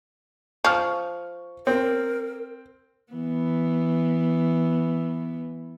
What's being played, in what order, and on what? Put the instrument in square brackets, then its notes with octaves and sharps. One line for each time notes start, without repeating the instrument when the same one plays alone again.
[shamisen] F3 [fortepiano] C#6 F6
[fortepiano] C4 [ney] A#4
[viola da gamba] E3 B3